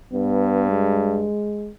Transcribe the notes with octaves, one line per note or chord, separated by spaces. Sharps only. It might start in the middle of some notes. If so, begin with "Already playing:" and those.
G2 B3
G#3